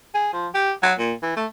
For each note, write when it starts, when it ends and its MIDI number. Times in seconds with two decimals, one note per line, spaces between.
0.14 0.30 68
0.33 0.48 53
0.54 0.72 67
0.83 0.94 54
0.99 1.13 46
1.23 1.36 52
1.37 1.46 57